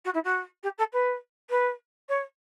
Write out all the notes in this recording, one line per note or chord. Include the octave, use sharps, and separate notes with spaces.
F#4
E4
F#4
G4
A4
B4
B4
C#5